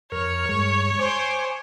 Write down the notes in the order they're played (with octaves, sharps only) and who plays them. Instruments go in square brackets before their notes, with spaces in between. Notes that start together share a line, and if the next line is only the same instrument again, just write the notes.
[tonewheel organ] F2 A#4 F6 [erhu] C#5
[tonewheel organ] G2 G#3
[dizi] C5 [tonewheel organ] G#5 D6